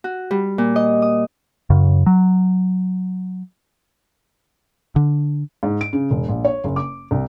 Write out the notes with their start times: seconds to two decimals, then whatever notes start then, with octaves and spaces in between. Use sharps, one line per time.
0.04 F#4
0.31 G3
0.58 A#2
0.76 D#5
1.02 D#6
1.70 F#2 C#3
2.06 F#3
4.96 D3
5.63 G#2
5.81 D7
5.93 C#3
6.11 E1
6.29 A#1
6.45 C#5
6.64 F#1
6.76 D6
7.11 C2